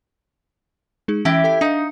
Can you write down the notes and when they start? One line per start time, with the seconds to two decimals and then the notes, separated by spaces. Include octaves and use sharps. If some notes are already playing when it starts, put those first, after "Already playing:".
1.08 G#3 D#4 G#4
1.25 E3 C#4 E4 G4 A#6
1.44 A4 G5 B6
1.61 D4 D#4 F5